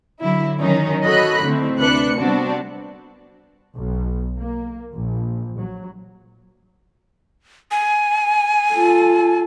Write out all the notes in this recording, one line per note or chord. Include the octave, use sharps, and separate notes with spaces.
D3 F#3 E4
D#3 F#3 C#4 D#4
F#4 A4 C#5 D#5 B5 F#6
D3 A3 C4 E4
D2 C3 D4 B4 F#6 C#7
G3 B3 C4 D4 F#4
B1
A#3
A#1
F#3
G#5
F4 A4